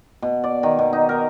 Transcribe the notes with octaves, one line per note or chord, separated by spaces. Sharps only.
B2
D5
D#3
B2
D#4
A#4